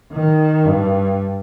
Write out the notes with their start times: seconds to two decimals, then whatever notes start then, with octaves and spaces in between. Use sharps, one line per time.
0.13 D#3
0.65 G2